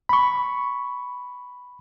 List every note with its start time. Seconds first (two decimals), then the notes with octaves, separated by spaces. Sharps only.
0.09 B5 C#6